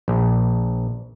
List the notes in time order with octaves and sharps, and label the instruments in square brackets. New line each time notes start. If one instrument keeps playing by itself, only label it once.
[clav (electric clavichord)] A#1